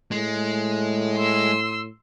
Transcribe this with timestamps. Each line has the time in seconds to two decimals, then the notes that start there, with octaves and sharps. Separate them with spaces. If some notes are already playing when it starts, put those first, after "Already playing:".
0.11 A2 G#3
1.17 C6 E6